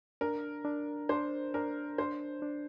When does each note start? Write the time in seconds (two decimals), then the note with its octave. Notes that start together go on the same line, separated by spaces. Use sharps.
0.21 D4 A#4
0.65 D4
1.09 D4 C5
1.54 D4 A#4
1.98 D4 C5
2.42 D4